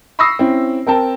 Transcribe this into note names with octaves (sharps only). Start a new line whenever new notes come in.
B5 C#6 D#6 E6 A#6 C7
C4 C#4 E4
C4 A#4 G5 A5